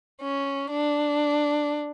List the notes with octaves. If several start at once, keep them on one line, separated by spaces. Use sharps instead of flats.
C#4
D4